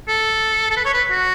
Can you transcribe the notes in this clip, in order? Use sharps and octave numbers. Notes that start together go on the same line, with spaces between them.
A4
A4
B4
C#5
B4
F#4